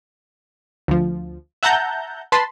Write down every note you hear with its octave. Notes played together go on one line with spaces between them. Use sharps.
D2 F3
E5 F#5 A5 A#5 G6
B4 A5 B5 C6